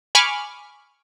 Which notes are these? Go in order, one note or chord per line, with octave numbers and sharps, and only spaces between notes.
G#5 B5 C#6 D6 F6